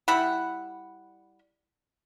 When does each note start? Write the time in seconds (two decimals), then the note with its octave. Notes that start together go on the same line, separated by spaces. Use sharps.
0.08 G3 E4 F#5 B5